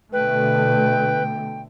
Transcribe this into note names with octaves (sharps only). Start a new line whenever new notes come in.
B2 D3 A3 B4 G5